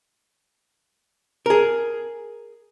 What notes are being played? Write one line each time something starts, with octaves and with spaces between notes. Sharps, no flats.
G#4 A#4